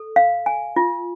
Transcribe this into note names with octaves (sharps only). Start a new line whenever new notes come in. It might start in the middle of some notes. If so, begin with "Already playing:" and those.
Already playing: A4
F5
G#5
F4